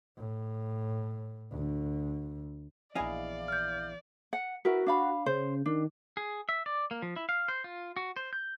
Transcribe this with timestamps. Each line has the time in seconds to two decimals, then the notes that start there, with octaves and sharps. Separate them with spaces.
0.17 A2
1.52 D2
2.95 A#1 E2 E4 D5 D#5 F5 G#5
3.48 F6 G6
4.33 F#5
4.65 E4 F#4 A#4 B4
4.86 D4 F5 B5
5.26 C#3 C5
5.66 D#3 D4
6.17 G#4
6.49 E5
6.66 D5
6.91 A#3
7.02 F3
7.16 E4
7.29 F5
7.48 C5
7.64 F4
7.96 F#4
8.16 C5
8.33 G6